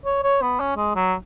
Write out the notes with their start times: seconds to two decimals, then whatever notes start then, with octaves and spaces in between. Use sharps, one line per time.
0.05 C#5
0.23 C#5
0.42 B3
0.60 C#4
0.76 G#3
0.95 F#3